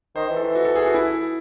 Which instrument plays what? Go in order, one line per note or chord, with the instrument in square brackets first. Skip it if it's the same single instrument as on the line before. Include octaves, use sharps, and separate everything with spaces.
[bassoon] D#3 [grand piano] C5
[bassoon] E3
[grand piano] A4
[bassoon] E3
[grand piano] F#4
A4
G#4
F#4
E4